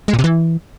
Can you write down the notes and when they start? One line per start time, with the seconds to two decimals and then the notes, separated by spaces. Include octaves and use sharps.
0.08 G#3
0.13 A#2
0.19 C3
0.24 E3